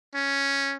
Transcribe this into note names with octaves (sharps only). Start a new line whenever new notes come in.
C#4